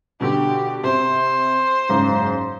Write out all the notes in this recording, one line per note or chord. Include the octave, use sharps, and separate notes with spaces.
B2 D3 G4
C3 C5
F#1 G#2 C#3